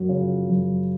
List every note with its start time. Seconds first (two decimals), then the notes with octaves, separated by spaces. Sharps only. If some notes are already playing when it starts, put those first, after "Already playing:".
Already playing: F#2 F#4
0.09 C#3 F3
0.48 F#2